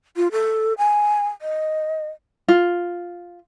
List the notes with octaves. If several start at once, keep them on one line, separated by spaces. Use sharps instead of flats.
F4
A4
G#5
D#5
F4